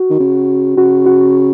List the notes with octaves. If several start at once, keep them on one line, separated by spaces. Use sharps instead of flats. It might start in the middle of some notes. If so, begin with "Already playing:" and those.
Already playing: F#4
D#3
C#3
C#3 F#4
F#4